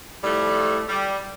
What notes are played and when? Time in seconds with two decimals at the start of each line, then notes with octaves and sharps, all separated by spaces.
0.24 A2 F3 G3 A3
0.89 G3